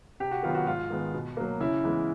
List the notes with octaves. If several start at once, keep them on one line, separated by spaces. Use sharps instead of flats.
C3 G4
F#4
D#3 F#3 B3 F4
F#4
G#2 F4
D#3 G#3 B3
B2
F#3 A#3
C#3 E4
E3 G#3 B3